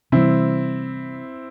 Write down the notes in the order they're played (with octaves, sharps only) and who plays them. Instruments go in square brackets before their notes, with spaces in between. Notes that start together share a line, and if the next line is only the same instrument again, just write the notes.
[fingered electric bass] C3 E3 G3 [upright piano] C4 E4